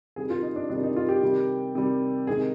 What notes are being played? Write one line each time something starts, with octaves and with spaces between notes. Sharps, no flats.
C3 D#3 G3 G#4
F4
D#4
D4
C3 D#3 G3 D4
D#4
F4
G4
C3 D#3 G3
C3 D#3 G3
C3 D#3 G#3 G#4